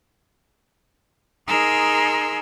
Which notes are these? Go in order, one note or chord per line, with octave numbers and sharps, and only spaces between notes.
D#4 G#4 A#4 G#5 C6 E6